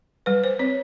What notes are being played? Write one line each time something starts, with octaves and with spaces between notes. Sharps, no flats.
G3 B4
C5
C4 C#5